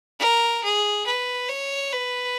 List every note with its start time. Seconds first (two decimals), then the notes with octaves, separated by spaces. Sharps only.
0.19 A#4
0.63 G#4
1.06 B4
1.49 C#5
1.92 B4